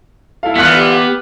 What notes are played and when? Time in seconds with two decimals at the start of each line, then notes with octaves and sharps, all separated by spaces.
0.43 E4 A4 F5
0.56 A#2 D3 E3 B3 F6 F#6 B6
0.75 G4